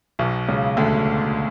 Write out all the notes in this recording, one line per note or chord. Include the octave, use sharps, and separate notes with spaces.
B1 B2
C#2 C#3
D2 D3